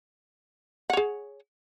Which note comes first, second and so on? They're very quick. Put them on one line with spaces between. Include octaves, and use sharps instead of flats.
F#5 C#5 G#4